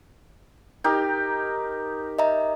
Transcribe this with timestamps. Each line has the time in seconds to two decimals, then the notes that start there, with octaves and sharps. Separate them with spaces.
0.84 D#4 G4 A#4
2.19 D#5 E5 A#5